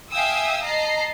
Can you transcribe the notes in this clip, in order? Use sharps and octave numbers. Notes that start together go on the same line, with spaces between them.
E5 F5 G5 G#5 D#6 E6
D#5 A5 A#5 C7